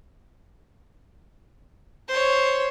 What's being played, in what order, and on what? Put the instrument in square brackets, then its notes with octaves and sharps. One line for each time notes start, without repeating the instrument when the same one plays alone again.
[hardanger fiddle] C5 C#5